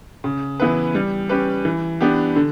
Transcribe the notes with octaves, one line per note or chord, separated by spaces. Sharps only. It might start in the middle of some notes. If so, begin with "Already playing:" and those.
C#3
E3 B3 E4 B4
G3
C#4 G4 B4
E3
B3 D4 G4
D3